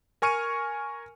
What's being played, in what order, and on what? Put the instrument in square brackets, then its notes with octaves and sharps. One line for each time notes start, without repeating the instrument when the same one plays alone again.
[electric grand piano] A#4 G#5 C#6 F6 C#7 D#7